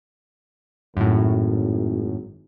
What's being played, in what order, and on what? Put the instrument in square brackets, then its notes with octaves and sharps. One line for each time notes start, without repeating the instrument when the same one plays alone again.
[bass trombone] G#1 [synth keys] F#2 A2